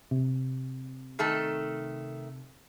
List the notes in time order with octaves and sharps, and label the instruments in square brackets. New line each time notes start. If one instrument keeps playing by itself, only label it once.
[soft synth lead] C3
[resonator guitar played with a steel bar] D#3 A3 A4